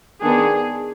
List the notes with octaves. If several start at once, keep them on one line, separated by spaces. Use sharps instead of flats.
D#3 B3 D4 G#4